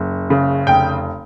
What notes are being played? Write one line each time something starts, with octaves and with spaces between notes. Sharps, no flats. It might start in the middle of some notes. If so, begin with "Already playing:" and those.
Already playing: F#1
C#3
F1 G5